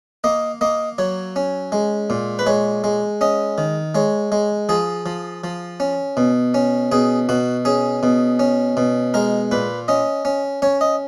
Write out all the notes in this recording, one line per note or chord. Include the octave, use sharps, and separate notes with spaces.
A#3 D#5
A#3 D#5
F#3 C#5
C#4
G#3
A#2
B4
G#3 C#5
G#3
C#4 D#5
D#3
G#3 C#5
G#3
F3 G#4
F3
F3
C#4
B2
C#4
B2 G#4
B2 F#4
C#4 G#4
B2
C#4
B2
G#3 A#4
A#2 B4
C#4 D#5
C#4
C#4 C#5
D#5